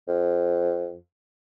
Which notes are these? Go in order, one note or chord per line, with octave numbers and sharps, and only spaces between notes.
F2